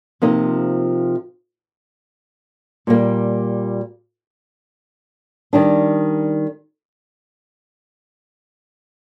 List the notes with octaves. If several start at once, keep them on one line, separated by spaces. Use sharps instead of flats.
C3 F3 A#3 D#4
A#2 G3 A#3
D#3 G3 D4